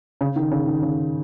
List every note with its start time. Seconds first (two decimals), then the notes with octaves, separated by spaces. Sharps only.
0.21 C#3
0.36 D#3
0.51 C#3
0.67 D#3
0.82 C#3